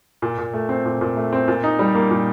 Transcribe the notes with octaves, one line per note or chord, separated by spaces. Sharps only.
A#2
A#2
A3
C4
A#2
A#2
A3
C4
A#2
D#4
G3
A#3
A#2